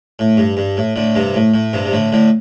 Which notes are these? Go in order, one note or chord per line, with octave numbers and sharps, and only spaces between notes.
A2
G2
G2
A2
A2 D3
G2 C3
A2
A2
G2 C3
C3
A2 D3
A2 D3